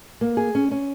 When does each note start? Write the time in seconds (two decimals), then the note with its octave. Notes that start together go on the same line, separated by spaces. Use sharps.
0.21 A#3
0.37 G#4
0.55 C#4
0.71 C#4